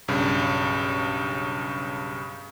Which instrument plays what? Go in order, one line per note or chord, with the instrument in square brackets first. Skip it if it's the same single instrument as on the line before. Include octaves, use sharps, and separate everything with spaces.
[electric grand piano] B1 G2 C#3